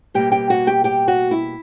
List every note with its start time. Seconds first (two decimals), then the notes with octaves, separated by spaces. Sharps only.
0.14 B2 G3 A#3 G4 G5
0.32 G4 G5
0.50 F#4 F#5
0.67 G4 G5
0.84 G4 G5
1.08 F#4 F#5
1.31 E4 E5